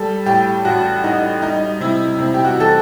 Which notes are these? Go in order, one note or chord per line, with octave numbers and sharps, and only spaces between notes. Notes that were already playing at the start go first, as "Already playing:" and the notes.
Already playing: G3 A4
A2 G4
A1 F#4
A1 D#4
G3 D#4
C3 E4
C3 E4
G4
F#4
E3 A4